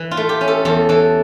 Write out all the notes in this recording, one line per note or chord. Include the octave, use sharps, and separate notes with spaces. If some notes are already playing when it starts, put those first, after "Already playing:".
Already playing: E3
F4
A3
G4
C#4
A4
E2 A4
E3 A4